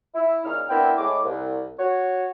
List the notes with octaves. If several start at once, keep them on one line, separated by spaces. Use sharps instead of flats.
E4
A#2 C#3 D#4 C#5 F6
B3 C4 D4 E4 A#4 G5
A2 G#3 D6
C2
F#4 C#5